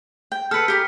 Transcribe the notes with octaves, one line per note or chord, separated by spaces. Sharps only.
G5
A4 B4 F6 B6 C#7
G4 G#4 A#4 B6